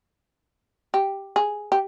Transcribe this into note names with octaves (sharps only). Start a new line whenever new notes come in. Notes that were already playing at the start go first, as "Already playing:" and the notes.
G4
G#4
G4